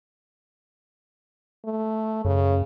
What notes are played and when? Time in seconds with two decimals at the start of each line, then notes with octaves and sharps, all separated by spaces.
1.65 A3
2.25 F#2 C#3